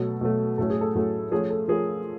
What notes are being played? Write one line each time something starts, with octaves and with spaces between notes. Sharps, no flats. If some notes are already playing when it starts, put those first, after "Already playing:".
Already playing: B2 F#3 A3 A4
B2 F#3 A3
A2 F#3 A3 C#4 A4
G#4
A4
A2 F#3 A3 C#4
F3 A3 C#4 G#4
A4
F3 A3 C#4 G#4 A#4